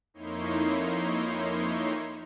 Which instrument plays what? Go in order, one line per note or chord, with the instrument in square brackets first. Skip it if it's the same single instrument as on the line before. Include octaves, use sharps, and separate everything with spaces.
[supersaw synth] F2 A#3 D#4 E4 C#5 C6